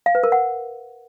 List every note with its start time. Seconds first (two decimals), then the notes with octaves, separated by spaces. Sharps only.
0.06 F5
0.15 B4
0.23 A#4
0.32 F#5